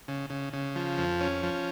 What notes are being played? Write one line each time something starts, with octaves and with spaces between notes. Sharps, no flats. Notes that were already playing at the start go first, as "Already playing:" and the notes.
C#3
C#3
C#3
F3
F2
C#4
F3